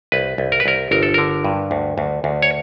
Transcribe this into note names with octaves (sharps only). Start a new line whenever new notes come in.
C2 B4
C2
A#4
B4
C2 A#4
G1 A#4
A4
D3 A#4
G2
D2
D2
D2
C#5